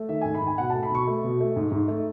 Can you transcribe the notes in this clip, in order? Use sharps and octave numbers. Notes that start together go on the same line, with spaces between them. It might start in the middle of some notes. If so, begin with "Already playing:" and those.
Already playing: A3
D#3 E5
G#2 G#5
B5
G#2
G#5
B2 F#5
A3 A5
B5
B2 C#6
A3
B2
A3
G#2
G#2
A3